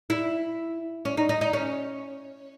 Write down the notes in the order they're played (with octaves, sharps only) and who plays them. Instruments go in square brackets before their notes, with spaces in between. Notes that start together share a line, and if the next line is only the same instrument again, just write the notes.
[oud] E4
C#4
D#4
D#4
D#4
C#4